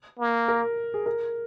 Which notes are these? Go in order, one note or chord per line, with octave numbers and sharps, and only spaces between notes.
A#3
A#4
G#4
A#4